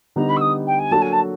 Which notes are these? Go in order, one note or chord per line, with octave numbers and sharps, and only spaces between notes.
D3 G3 B3 D#4 A#5
B5
E6
D#6
G5
G#5
F#3 A#3 D4 F#4 A4 A5
G#5
A5